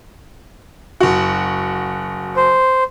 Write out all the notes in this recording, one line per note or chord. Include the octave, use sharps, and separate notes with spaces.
F#1 F#4
C5